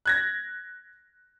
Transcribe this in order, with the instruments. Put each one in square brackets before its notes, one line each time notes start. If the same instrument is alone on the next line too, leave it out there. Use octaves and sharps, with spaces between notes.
[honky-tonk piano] F#6 G#6 A#6